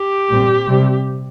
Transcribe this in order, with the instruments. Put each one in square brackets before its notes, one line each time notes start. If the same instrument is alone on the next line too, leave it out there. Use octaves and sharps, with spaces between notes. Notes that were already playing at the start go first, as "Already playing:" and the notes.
Already playing: [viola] G4
[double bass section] A#2 G3 C4
C3 G3 C4